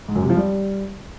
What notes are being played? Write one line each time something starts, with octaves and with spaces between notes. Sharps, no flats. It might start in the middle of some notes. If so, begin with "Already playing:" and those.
G#2
F#2
C3
F3
G3